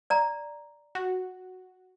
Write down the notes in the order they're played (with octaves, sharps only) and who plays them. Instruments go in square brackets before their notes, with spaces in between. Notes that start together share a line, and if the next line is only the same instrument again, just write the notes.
[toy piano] D5 A#5
[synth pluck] F#4